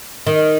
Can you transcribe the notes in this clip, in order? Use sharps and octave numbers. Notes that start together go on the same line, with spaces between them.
D#3